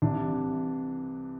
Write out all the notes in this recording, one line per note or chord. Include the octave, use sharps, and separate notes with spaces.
C2 C3 E3 D4